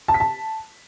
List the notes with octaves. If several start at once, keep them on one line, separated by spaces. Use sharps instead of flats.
A5
B6
A5